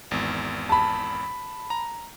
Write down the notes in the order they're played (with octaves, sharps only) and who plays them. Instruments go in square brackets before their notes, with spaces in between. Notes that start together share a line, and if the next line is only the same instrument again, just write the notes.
[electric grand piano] G#1 E2
[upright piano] A5 B5
[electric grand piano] A#5